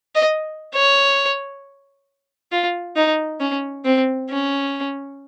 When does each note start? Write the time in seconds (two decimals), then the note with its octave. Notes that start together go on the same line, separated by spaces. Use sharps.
0.15 D#5
0.74 C#5
2.52 F4
2.96 D#4
3.40 C#4
3.85 C4
4.30 C#4